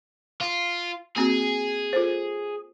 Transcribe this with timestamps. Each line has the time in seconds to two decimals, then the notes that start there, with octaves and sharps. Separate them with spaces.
0.41 F4
1.17 A#3 C4 F#4 G#4
1.93 F4 A4 C5